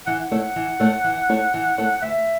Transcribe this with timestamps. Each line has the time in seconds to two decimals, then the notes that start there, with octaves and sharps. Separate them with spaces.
0.06 E3 F#5
0.21 F#5
0.31 A3 E4 A4 C#5
0.56 E3
0.80 A3 E4 A4 C#5
1.04 E3
1.29 A3 E4 A4 C#5
1.54 E3
1.78 A3 E4 A4 C#5
2.01 D2 E5